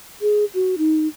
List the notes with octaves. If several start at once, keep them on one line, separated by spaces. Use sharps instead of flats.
G#4
F#4
D#4